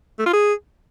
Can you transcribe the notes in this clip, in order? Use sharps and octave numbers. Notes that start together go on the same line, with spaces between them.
A3
F4
G#4